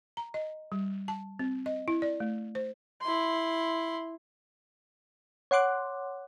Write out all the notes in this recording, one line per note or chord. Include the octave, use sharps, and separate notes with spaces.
A#5
D#5
G3
A5
C4
D#5
E4
D5
A3
C5
E4 C6
C#5 F#5 C6 D6 F#6